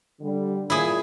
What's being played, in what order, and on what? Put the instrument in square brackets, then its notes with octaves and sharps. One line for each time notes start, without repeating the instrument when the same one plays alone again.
[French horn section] D3 G3
[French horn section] A#2 [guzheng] E4 G#4